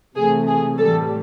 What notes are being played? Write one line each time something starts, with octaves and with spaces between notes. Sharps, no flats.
C3 E3 A3 G#4
G#4
A2 E3 G3 A4